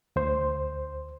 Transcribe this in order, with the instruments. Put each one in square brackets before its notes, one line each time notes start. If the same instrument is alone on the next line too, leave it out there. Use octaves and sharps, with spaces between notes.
[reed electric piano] D2 C5